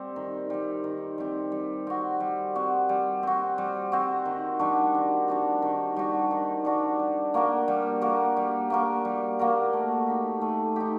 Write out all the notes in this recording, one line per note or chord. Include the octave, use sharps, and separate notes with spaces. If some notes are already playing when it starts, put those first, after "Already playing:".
Already playing: G3 C4
D#3
G3 C4
D#3
G3 C4
G3
C4 F#4
G3
C4 F#4
G3
C4 F#4
G3
C4 F#4
D#3
G3 D4 F#4
D#3
G3 D4 F#4
D#3
G3 D4 F#4
D#3
G3 D4 F#4
G3
A#3 F#4 A#4
G3
A#3 F#4 A#4
G3
A#3 F#4 A#4
G3
A#3 F#4 A#4
A3
D#4 G4
A3
D#4 G4